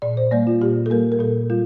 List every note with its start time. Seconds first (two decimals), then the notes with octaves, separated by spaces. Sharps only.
0.02 A#2 D5
0.17 C5
0.31 G3 A#3 D5
0.47 F4
0.62 A#2 G4
0.86 A4
0.90 G3 A#3 A#4
1.12 A#4
1.19 A#2 A4
1.50 G3 F4